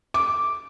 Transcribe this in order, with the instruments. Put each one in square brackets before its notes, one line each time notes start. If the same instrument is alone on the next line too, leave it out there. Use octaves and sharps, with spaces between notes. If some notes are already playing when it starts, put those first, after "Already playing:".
[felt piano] D6